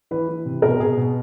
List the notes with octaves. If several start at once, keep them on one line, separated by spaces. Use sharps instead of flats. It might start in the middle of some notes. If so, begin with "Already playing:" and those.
E3 B4
E3
C3
B2 A#4
B2 G#4
B2